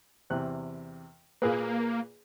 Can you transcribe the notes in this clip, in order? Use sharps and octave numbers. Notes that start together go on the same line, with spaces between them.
E2 C3 F#6
A#2 A#3 G#4 B4